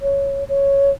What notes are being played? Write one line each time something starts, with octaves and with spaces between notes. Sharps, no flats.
C#5
C#5